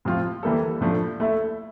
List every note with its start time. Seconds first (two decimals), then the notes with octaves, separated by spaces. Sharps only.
0.05 A2 F3 C4 F4
0.43 E3 G3 A#3 E4 A4
0.81 A2 F3 A3 D4
1.20 A3 E4 A4 E5